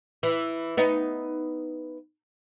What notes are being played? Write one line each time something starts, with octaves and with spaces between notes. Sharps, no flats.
E3
B3 D#4